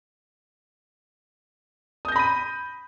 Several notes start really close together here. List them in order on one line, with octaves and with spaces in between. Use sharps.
D#6 G6 A#6 B5 D#7